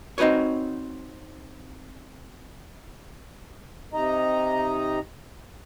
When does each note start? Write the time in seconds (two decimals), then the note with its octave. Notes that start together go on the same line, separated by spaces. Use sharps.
0.18 C4 D#4 F#4 B4 C#5
3.93 C3 D#4 D#5 A#5